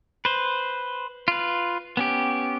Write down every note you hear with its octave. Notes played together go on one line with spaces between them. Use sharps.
B4 C5
F4 B4
B3 C#4 G4